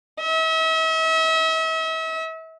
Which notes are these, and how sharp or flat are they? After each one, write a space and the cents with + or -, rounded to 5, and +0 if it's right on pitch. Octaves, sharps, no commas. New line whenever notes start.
E5 -40